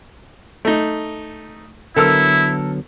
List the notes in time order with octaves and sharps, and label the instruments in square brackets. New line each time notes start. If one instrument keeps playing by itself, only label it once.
[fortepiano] A3 D#4
[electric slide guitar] D3 F#3 B3 [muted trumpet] E4 [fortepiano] A4 A#4 E6